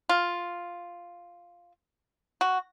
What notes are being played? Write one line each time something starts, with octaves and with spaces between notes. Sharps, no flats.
F4
F#4